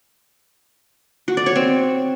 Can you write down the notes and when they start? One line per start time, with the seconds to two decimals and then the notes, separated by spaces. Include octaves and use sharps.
1.28 F#4
1.37 D5
1.46 C#5
1.56 C4